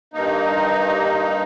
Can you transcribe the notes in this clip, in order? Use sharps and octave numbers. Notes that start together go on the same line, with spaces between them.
G2 A#3 D#4